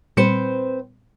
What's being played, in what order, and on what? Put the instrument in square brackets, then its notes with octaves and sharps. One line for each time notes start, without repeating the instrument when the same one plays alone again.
[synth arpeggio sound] A#2 G3 C#7 [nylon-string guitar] C4 B4 C5